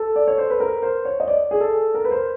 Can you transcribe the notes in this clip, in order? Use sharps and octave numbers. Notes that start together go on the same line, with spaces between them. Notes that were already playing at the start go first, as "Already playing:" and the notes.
Already playing: A4
D5
C#5
C5
B4
A#4
C5
C#5
D#5
D5
G#4
A4
A#4
B4
C5